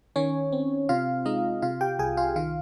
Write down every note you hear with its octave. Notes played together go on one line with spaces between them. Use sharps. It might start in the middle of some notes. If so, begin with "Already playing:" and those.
D#3 C#4 C#5
C4
C3 F4 F5
G#3 D#4 D#5
C3 F4 F5
G4 G5
C2 G#4 G#5
F4 F5
D#3 F4 F5